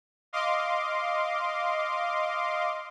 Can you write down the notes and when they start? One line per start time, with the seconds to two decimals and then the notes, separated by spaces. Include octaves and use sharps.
0.33 D#5 F5 C6 D6